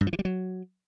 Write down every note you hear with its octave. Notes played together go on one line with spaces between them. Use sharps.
G2
F3
E3
G3
F#3